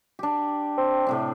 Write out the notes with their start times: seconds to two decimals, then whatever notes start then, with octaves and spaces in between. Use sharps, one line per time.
0.19 D4 G4
0.78 C4
1.07 A2 C3 D4